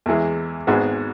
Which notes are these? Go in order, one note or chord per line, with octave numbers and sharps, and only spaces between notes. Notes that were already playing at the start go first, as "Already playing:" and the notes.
E2 E3 G#3
G#1 G#2 G#3 B3 F#4